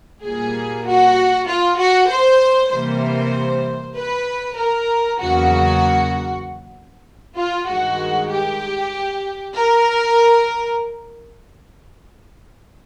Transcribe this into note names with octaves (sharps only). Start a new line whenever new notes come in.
A#2 G3 A#3 G#4
F#4
F4
F#4
C5
C3 E3 G3 A#3 C5
B4
A#4
E2 C#3 F#3 A#3 F#4
F4
G2 D#3 G#3 F#4
G4
A#4